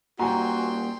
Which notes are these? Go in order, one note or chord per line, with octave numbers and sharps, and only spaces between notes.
A#2 G3 F#4 G5 G#5 A#5 C6